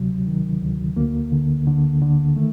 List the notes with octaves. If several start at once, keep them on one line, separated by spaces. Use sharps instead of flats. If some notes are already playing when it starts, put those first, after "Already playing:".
Already playing: D2 C3 F#3
D#3
D2
D2 A#3
D3
D3
D3
D#3 A3